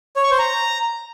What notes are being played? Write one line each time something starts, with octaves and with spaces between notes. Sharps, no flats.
C#5
C#6
C5
A#5